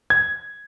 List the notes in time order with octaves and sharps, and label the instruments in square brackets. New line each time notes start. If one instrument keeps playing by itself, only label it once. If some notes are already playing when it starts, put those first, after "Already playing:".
[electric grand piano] G#6